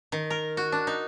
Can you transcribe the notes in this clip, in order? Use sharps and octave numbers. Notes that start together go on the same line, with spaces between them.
D#3
A#4
F#4
D4
D#4